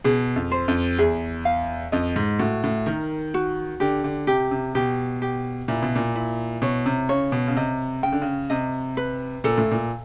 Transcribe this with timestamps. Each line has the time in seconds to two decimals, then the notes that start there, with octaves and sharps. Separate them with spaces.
0.04 B2 G#4
0.36 F2
0.52 C5
0.68 F2
0.99 E2 G#4
1.45 F5
1.92 F2 D#5
2.16 G#2
2.39 A2 F#4
2.64 A2
2.86 D#3 A#4
3.34 F#4
3.80 D3 G4
4.04 D3
4.27 C3 G4
4.51 C3
4.75 B2 G4
5.22 G4
5.68 A#2 E4
5.83 B2
5.95 A#2
6.15 E4
6.62 B2 C#5
6.86 C3
7.09 C#3 C#5
7.32 B2
7.47 C#3
7.56 C3 D#5
8.03 C#3 G5
8.13 D3
8.22 C#3
8.50 C3 D#5
8.97 B4
9.44 A#2 A4
9.58 A2
9.71 A#2